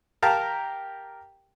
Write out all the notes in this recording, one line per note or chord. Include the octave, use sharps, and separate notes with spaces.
G4 A#4 F5 A5 A#5